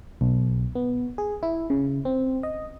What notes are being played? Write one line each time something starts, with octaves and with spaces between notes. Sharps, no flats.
B1
B3
G#4
E4
C#3
C4
D#5